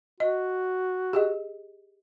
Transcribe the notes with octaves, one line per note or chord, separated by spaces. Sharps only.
F#4 D#5
G4 G#4 D#5